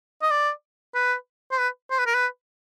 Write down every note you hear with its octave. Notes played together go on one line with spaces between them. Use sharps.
D#5
D5
B4
C5
B4
C5
B4
A#4
B4